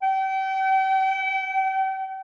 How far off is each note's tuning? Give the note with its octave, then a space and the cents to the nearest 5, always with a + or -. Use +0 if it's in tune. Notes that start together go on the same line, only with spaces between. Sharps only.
G5 -40